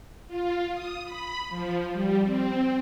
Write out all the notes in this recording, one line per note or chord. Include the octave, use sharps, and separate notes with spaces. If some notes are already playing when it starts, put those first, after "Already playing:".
F4
D#6
B5
F3
G3
C4